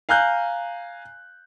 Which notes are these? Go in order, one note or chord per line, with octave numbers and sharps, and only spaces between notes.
F5 G#5 A#5 F#6 G6